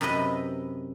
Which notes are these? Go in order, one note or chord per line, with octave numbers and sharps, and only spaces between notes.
F#2 C3 E4 B4 D#5